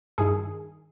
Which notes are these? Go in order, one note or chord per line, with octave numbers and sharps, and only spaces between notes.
G2 D#3 G#4